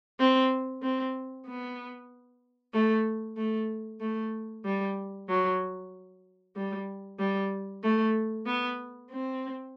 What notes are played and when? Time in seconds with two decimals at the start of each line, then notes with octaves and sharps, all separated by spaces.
0.20 C4
0.83 C4
1.47 B3
2.73 A3
3.37 A3
4.00 A3
4.65 G3
5.29 F#3
6.56 G3
7.19 G3
7.83 A3
8.46 B3
9.10 C4